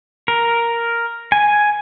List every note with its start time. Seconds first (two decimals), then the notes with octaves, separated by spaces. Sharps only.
0.28 A#4
1.32 G#5